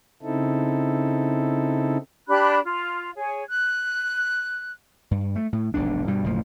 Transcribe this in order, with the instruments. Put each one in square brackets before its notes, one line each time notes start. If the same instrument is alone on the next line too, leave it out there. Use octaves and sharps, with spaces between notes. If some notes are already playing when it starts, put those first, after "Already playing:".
[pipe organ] C#3 C4 D#4 E4 A4
[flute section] D4 G4 B5 F#6
F4
G#4 C#5
F#6
[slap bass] G2
A3
A2
F1 B1 G#2 D4
G2 B2 G3
F#1 D2 A2 F3